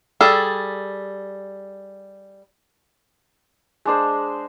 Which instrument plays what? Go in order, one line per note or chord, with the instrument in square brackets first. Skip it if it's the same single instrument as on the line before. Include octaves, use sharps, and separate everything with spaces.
[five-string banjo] G3 G#4 A4
[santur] G#3 D4 C5